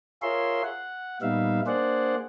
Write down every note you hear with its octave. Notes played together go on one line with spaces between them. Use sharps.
F4 G#4 A#4 C#5 E5 C6
F#5
A#2 G3 B3 D#4 E5 F5
A#3 D4 G#4 C5 D5 F#5